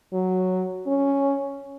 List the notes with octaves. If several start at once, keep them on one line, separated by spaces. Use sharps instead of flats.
F#3
C#4